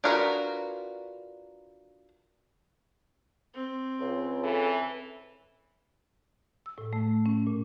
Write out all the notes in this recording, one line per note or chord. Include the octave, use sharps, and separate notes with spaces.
D4 F4 F#4 A#4 B4
C4
C#2
E3 A4
E6
A2
A3
C#4
A#2